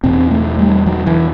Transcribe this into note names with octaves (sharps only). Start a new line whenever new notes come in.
E2 B2 C4
A3
G3
F#3
E3